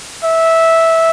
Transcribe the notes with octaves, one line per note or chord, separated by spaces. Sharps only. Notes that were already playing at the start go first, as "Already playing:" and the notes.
E5